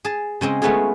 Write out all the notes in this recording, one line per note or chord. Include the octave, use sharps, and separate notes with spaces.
G#4 A5
C#3 G#3 C4 D#5
G#3 A3 B3 C#4 F4 G#4